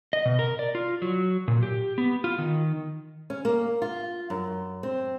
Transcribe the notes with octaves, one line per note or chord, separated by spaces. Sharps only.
D#5
B2
A#4
D5
F4
F#3
A#2
G4
B3
F4
D#3
C#4
A#3
F4
F#2
C4